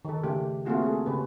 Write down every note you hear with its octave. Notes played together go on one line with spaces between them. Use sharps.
D#3 A4
C#3 A3 G4
A3 A#3 C4 F4 F#4 G#4
G#4 A4
C#3 G4 B4